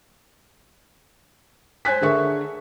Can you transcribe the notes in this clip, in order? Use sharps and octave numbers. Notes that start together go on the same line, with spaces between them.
C5 G#5 F#6 B6
D3 G#4 A#4 E5 C#6